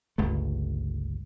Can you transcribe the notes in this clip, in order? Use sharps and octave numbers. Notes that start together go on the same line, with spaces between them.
G1 C#2 A3